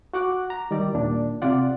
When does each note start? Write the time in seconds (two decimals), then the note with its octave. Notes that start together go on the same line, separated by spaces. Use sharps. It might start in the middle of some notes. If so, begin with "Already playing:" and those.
0.14 F#4 F#5 D6 F#6
0.50 A#5
0.71 D#3 G3 D5
0.93 D#2 A#2 D4
1.42 C3 F4 D5 F#5